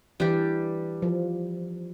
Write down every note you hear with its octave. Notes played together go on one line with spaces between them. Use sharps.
E3 G3 D4 G4
F3